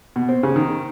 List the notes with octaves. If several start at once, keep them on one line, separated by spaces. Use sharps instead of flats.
B2
C4
C#3
D#3